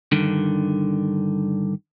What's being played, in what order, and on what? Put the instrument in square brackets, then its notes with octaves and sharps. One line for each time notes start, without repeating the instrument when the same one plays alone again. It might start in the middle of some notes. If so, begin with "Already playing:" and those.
[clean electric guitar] G2 D3 D#3